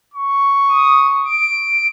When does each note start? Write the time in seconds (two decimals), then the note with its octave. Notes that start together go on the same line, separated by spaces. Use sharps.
0.14 C#6
0.68 D#6
1.25 D7